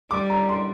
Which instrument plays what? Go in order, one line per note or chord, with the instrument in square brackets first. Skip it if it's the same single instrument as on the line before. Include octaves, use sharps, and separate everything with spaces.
[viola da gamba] G3 [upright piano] D6
[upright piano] A#5
C6